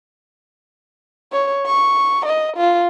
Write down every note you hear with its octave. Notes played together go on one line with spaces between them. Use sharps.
C#5
C#6
D#5
F4